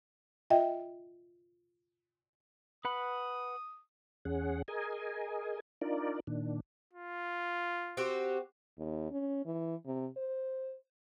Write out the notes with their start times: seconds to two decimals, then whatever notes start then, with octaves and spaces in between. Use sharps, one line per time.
0.50 F4 D#5 E5 G5
2.85 B4 F#5 B5 D#6
4.25 E2 C#4 G#4 F#5
4.68 G#4 A#4 D#5 G#5
5.81 D4 D#4 F4 A#4 D5
6.27 A#2 D#3 D4
6.93 F4
7.97 C4 F#4 G4
8.79 D#2
9.11 C#4
9.46 E3
9.86 C3
10.17 C5